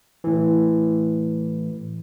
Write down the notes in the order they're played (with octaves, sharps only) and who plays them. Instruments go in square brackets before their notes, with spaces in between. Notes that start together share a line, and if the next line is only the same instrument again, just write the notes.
[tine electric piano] A2 E3